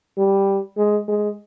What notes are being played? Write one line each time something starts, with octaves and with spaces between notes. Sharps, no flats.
G3
G#3
G#3